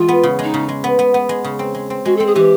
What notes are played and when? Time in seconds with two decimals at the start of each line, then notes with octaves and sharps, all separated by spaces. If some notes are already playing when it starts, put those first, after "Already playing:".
Already playing: E2 G#3 F4
0.08 B3
0.23 C#3
0.39 G#3 D#4
0.54 C#3
0.69 G#3
0.84 B3
0.99 B3
1.14 B3
1.29 G#3
1.44 C#3
1.59 C4
1.75 G#3
1.90 C4
2.05 G#3 F#4
2.17 C4 A4
2.27 G#4
2.35 E3 G4